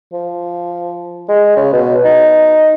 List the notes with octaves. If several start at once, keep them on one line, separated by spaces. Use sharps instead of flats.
F3
G#3
C#3
B2
D#4